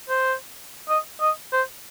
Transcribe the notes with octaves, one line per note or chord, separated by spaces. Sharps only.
C5
D#5
D#5
C5